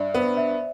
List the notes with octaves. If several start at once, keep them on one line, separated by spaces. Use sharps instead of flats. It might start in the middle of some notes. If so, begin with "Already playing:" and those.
Already playing: G2 D5 E5
B3 C5
E5